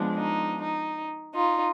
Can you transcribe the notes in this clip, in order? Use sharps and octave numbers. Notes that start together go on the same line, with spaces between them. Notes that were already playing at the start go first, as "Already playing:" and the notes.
Already playing: F3 G#3 B3 D4
D#4
D#4
D#4 F4